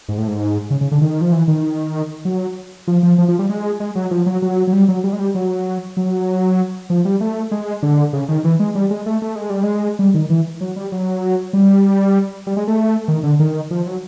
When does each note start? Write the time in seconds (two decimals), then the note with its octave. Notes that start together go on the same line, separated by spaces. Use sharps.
0.08 G#2
0.18 A2
0.28 G#2
0.71 C#3
0.81 C#3
0.92 D3
1.01 D#3
1.21 F3
1.32 E3
1.48 D#3
2.25 F#3
2.88 F3
3.03 F3
3.18 F3
3.28 F3
3.39 G3
3.49 G#3
3.80 G#3
3.95 F#3
4.11 F3
4.26 F#3
4.42 F#3
4.67 F#3
4.73 G3
4.88 F#3
5.04 G3
5.13 G#3
5.19 G3
5.35 F#3
5.97 F#3
6.90 F3
7.05 G3
7.21 A3
7.51 G#3
7.83 D3
8.13 C#3
8.29 D#3
8.44 E3
8.60 G#3
8.75 G3
8.91 G#3
9.06 A3
9.22 A3
9.36 G#3
9.50 G3
9.63 G#3
9.99 G3
10.14 D#3
10.30 E3
10.61 F#3
10.76 G3
10.92 F#3
11.53 G3
12.47 G3
12.57 G#3
12.68 A3
13.08 D#3
13.23 D3
13.39 D#3
13.71 F3
13.86 F#3